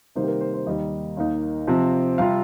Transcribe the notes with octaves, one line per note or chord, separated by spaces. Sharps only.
C3 D#3 G3 A#3 D#4 C5
G4
A#4
C5
C5
D#2 D#3 G3 D#4 D#5
D#2 D#3 A#3 D#4
C3 F3 C4
C3 G3 C4 F4 F5